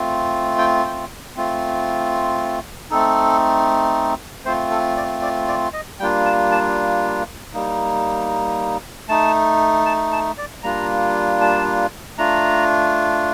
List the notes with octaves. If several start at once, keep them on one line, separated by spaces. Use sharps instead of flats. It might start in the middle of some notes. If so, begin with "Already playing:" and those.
Already playing: A3 C4 F4
G5
G5
A3 C4 F4
A3 C4 D#4 A4
A3 C4 F4 C5
A4
D5
D5
D5
D#5
G3 A#3 D4 F4 G5
A5
A5
G3 A#3 D#4
A3 D#4 A5
A5
A5
D5
G3 A#3 D4 F4 A#5
A5
A3 D4 F4 A#5